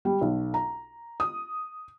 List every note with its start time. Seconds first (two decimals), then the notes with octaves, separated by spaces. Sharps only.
0.05 G3
0.21 B1
0.54 A#5
1.20 D#6